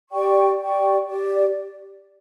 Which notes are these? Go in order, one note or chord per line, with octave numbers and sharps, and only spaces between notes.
G4 D5 G5 C#6
G4 D5 G5 C#6
G4 D5